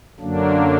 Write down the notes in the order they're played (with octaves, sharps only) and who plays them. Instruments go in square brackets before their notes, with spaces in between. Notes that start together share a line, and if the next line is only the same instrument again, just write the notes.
[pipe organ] F#2 D3 F#3 A#3 D4